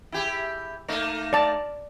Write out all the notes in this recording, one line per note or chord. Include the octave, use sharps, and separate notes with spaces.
E4 G4 G#4
A3 A#3 D#4
D5 A5